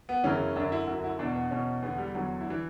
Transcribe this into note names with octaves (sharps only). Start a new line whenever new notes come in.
B3
F#2 C#3 E3 C#4
F#2 D3 D4
E4
F#2 D3 F#4
F#4
E4
E2 B2 D4
B3
E2 B2 C#4
E2 D3 B3
G3
E2 D3 F#3
E4
E3 D4